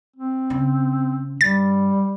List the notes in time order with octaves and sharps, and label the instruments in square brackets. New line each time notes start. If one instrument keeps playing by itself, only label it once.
[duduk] C4
[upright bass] C#3
[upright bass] G2 [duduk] G3 [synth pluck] A6